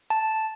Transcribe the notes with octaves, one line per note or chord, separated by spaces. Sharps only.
A5